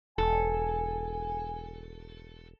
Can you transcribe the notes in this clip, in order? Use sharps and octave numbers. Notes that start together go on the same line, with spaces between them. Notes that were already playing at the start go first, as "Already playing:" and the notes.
E1 A4 G#5